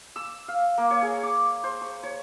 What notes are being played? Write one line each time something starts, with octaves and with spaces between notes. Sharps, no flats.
E6
F5
A#3
C#5
G#4
D6
C5
C#6
C#5